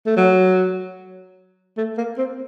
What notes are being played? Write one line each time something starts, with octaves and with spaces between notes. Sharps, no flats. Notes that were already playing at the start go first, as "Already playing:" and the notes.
A3
F#3
A3
A#3
C4